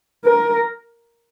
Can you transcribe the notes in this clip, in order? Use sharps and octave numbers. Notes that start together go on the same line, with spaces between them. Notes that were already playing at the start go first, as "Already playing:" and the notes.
A#4